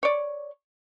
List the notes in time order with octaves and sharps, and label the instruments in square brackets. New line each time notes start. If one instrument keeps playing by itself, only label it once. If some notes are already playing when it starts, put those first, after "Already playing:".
[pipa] C#5 D5